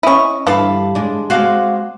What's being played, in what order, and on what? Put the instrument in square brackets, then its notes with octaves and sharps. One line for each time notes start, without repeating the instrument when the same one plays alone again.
[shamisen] C#4 E4 [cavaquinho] D#5 C#6
[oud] G2 [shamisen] D3 E3 [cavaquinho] F5 A5 B5
[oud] G#3 D4
[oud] G#3 B3 C4 [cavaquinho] F#4 F5 D6